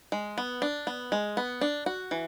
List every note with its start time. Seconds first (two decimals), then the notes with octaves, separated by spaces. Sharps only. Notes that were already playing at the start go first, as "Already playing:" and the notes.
0.12 G#3
0.38 B3
0.62 D4
0.87 B3
1.12 G#3
1.37 B3
1.61 D4
1.86 F#4
2.11 E3